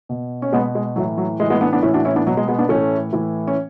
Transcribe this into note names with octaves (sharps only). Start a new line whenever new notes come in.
B2
C#4
B2 G#3 B3
G#3
A2 E3 F#3
F#3
A2 E3 G#3
G#3 B3
B3 D4
B3 D4
A2 E3 C#4 E4
D4 F#4
C#4 E4
B3 D4
B2 F#3
G#3
G#3 B3
B3 D4
A2 E3 A3 C#4
A2 E3
C#4